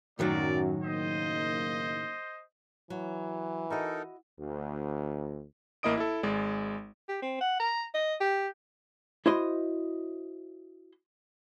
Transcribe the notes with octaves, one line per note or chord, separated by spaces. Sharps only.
F#2 A2 D#3 F#3 A#4 D5
F#1 A#3 D#4 C5 D#5
E3 F#3
D#4 E4 F#4 A4 A#4 D#5
D2
A1 A#3 E4 D#5 D#6 D7
E4 A4
G#1 G#3 D5
G4
C4
F#5
A#5
D#5
G4
E4 F#4 C5 D#5 C6